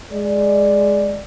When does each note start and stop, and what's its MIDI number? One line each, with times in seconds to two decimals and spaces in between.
0.12 1.21 56
0.12 1.21 74